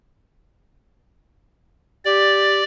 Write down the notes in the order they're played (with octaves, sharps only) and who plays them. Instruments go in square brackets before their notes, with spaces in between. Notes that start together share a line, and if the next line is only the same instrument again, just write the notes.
[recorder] G4 [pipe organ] D5